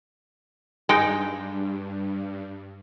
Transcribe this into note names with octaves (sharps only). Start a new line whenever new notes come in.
G2 G#3 D#4 G5